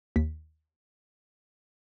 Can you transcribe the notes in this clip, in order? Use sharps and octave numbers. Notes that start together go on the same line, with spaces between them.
D#2 B6